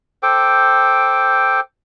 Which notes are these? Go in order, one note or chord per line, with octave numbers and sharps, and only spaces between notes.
A4 C5 G5 D6